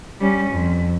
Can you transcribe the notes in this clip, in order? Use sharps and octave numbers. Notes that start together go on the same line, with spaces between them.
G3 C#4
F2